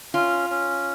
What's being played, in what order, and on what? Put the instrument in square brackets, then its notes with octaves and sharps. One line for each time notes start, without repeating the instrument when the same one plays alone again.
[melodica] C#4 [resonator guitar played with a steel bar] F4
[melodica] C#4